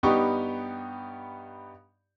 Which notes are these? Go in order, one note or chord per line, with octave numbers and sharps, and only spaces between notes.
G2 B3 D#4 G4 C#6